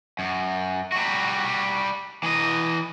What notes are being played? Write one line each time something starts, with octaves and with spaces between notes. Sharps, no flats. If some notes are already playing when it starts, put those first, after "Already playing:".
F#2
G3 F#4
E3 D#5